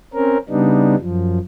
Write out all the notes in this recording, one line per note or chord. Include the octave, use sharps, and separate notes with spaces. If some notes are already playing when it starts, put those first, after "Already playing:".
C4 C#4 A#4
C#3 G3 B3 D4 D#4
F#2 F3